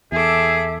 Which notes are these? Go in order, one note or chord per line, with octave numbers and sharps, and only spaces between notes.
E2 G#4 A4 E5 D6